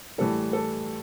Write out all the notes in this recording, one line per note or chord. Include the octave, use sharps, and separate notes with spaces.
A2 E3 G3 A4
A4